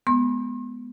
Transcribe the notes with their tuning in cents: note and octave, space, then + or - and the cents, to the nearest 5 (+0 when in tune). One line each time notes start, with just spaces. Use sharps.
G#3 +20 B3 +0 C6 +45